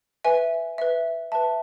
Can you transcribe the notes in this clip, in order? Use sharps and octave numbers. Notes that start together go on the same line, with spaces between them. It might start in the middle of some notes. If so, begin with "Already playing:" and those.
B4 E5 G#5
B4 E5
B4 E5 A5